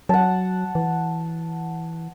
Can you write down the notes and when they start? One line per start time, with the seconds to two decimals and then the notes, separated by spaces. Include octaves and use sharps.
0.09 F#3 F#5 A5
0.75 E3